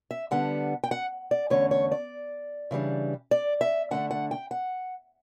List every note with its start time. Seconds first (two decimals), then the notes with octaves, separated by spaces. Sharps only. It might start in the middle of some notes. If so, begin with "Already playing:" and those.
0.11 E5
0.31 D3 G3 B3 D4 F#5
0.84 G5
0.91 F#5
1.31 D5
1.50 E2 D3 A3 C#4 C#5
1.71 C#5
1.92 D5
2.71 C#3 E3 G3 D4
3.31 D5
3.61 E5
3.91 D3 A3 D4 F#5
4.11 F#5
4.31 G5
4.51 F#5